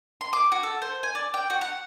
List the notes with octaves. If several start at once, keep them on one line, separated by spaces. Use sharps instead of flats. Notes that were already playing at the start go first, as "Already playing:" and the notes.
C6
D6
F#4
A4
C5
G#5
D5
G5
F#4
F#5